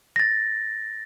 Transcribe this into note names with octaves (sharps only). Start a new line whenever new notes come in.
A6 A#6